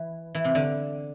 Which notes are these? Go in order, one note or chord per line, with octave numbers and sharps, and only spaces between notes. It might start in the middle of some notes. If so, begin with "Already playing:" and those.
Already playing: E3
E3
C3
D3